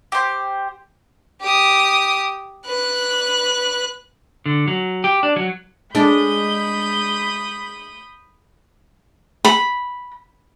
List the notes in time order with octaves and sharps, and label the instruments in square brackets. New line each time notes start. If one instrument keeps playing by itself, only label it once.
[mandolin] G4 C5
[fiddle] G4 D#6
B4 F#6
[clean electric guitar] D3
F#3
G4
D4
F#3
[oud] G#3 D4 [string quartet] B5 D#6 G6
[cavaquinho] B5